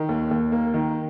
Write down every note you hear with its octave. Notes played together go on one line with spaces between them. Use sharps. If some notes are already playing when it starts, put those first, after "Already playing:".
Already playing: D#3
D#2
D#2
A#3
D#3